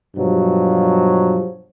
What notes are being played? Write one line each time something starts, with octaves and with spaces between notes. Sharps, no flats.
G2 B2 F3 F#3